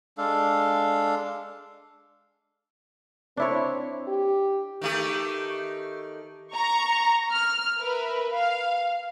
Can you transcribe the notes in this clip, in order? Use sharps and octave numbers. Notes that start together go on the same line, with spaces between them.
G#3 D4 A4 F5
C4 D4 E4 C#5
G4
D#3 A3 G4
A#5 C#6
F6
A#4 B4 E5
F5